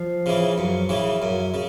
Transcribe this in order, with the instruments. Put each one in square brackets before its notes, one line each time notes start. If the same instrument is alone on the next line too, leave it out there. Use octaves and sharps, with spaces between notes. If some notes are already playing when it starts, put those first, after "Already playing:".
Already playing: [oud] F3
[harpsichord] C#3 E3
F#2
C#3 E3
F#2
C#3